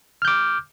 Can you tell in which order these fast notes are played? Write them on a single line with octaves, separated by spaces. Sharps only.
F6 G6 D6